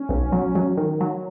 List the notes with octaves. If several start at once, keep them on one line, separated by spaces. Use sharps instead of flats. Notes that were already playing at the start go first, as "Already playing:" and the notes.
Already playing: C#4
B1
F#3
F#3
D#3
F#3